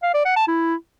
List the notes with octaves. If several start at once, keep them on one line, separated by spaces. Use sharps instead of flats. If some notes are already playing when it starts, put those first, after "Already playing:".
F5
D5
F#5
A5
E4